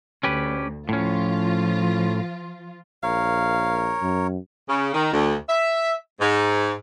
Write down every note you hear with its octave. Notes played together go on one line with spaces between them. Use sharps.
D2 C#4 G4 B4
A2 F3 C#4 F4
A#1 A#4 C#5 F5
F#2
C#3
D#3
D2
E5
G#2